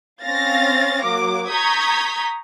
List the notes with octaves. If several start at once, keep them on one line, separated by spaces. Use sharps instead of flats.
C4 C#4 F5 A6 A#6
F#3 A#3 D6
A#5 C#6 D#6 G6 G#6 B6